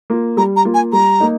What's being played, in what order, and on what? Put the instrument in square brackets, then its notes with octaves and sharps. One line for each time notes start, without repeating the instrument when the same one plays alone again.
[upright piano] A#3 F4
[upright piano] G3 [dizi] A#5
[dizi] A#5
[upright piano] A#3 F4
[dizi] G#5
[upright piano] G3 [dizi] A#5
[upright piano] A#3 D#4